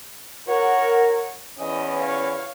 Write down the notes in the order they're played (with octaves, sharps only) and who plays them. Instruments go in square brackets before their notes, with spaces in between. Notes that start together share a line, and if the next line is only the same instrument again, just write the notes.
[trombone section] F#4 A#4 [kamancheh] C#5 F#5
[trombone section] E2 E3 C#4 [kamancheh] D#5
[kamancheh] C#5 F5